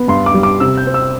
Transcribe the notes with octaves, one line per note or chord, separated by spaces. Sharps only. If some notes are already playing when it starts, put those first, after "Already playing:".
Already playing: B3
G2 C6
D6
G3
D6
C3 E6
G6
C4
E6